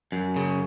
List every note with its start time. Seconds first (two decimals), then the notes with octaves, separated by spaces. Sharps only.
0.12 F#2
0.36 C#3